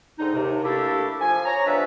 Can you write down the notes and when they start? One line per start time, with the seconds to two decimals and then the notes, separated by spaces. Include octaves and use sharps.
0.19 G#2 D3 C4 D#4
0.34 D#2 C3
0.64 A3 A#3 D4 E4 G4 A4
1.20 F3 G#5
1.46 C#5 A#5
1.66 F3 G3 B3 D4 B4 E5